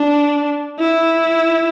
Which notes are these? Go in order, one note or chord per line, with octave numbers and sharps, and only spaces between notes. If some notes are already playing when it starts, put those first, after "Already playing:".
Already playing: D4
E4